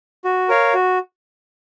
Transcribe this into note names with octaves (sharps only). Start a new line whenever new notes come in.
F#4
A#4 C#5 F5
F#4